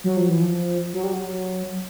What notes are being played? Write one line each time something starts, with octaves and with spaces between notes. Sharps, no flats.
F#3
F3
E3
F3
F#3
G3
F#3